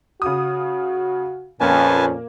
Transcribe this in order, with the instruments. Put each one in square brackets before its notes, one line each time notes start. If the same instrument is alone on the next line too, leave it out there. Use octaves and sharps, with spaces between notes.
[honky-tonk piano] C#3 D#6 [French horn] F#4
[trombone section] F2 C#4 [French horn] A#2 [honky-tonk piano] A#3 [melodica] B4 G#5 A5